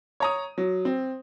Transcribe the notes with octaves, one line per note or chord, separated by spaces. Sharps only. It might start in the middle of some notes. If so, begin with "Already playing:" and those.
C#5 A#5 D#6
F#3
C4